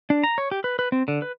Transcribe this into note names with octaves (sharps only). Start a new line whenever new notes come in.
D4
A#5
C#5
G4
B4
B4
C4
D3
B4